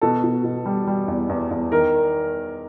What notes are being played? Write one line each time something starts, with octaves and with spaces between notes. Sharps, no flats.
B2 A4
B2
B2
G3
G3
E2
E2
E2
D#3 A#4